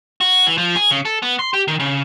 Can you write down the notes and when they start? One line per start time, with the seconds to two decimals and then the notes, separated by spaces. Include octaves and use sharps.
0.21 F#4
0.47 E3
0.58 F3
0.76 G#4
0.91 C#3
1.05 A4
1.22 B3
1.39 C6
1.54 G4
1.68 D#3
1.80 C#3